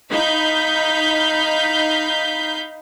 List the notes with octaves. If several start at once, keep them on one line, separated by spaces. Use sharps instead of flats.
D#4 F5 B5 G6 B6